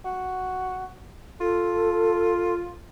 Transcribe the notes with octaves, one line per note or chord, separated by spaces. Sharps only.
F#4
F4 A4